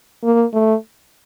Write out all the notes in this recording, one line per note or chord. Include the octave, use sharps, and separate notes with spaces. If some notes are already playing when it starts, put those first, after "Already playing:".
A#3
A3